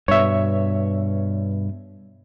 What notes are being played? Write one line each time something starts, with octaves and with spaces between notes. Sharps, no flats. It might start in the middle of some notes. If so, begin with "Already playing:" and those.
G2 B2 C#5 E5